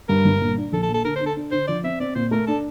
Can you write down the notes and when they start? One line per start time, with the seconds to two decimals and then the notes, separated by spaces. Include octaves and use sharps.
0.09 G2 A#4
0.25 G1
0.41 A#2
0.57 D4
0.73 A#1 A4
0.83 A4
0.89 A#2
0.94 A4
1.05 D3 A#4
1.16 C5
1.21 D3
1.26 A4
1.37 D4
1.52 D3 C5
1.68 F3 D5
1.83 C4 E5
2.00 C4 D5
2.15 A#2 C5
2.31 A3 A#4
2.47 D4 A4